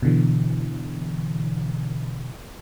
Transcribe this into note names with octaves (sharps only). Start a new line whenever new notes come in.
B2 D3 E3